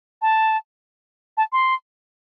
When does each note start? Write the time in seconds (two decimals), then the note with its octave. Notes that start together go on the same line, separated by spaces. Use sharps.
0.22 A5
1.37 A5
1.52 C6